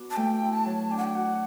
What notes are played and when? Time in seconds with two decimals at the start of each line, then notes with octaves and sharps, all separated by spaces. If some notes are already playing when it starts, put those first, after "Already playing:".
Already playing: B3 D4 F#4
0.10 A5
0.16 A3 G5
0.42 E4
0.53 A5
0.65 F#3
0.91 D4 G5
0.97 F#5
1.04 G5
1.15 F#4 F#5